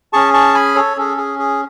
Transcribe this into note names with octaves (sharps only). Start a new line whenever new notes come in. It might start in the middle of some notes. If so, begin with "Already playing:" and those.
C#4 G#4 A5 C#6
A5 C#6
G#5 B5
A4 C#5
C#4 G#4 A4
G#4
G#4